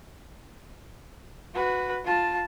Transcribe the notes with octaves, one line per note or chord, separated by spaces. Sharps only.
F#4 B4
F4 A5